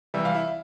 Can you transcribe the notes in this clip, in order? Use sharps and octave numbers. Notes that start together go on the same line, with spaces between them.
C3 E3 G3 E5
F5
E4 E5